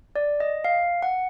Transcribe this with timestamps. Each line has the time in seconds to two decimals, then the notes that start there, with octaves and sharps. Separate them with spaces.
0.16 D5
0.40 D#5
0.64 F5
1.03 F#5